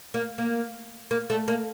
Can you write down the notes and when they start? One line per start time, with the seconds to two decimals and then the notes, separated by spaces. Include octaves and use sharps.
0.14 A#3
0.38 A#3
1.11 A#3
1.30 A3
1.48 A#3